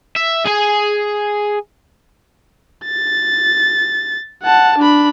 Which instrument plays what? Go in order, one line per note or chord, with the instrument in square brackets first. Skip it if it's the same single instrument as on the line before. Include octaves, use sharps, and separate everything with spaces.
[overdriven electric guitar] E5
G#4 G#5
[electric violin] A6
F#5 A5
D4 B5